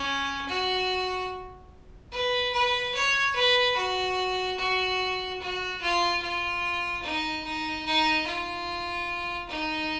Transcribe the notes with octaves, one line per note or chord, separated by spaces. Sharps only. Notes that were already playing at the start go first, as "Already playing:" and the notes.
Already playing: C#4
F#4
B4
B4
C#5
B4
F#4
F#4
F#4
F4
F4
D#4
D#4
D#4
F4
D#4